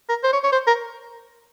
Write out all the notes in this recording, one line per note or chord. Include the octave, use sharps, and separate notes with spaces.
A#4
C5
C#5
C#5
C5
A#4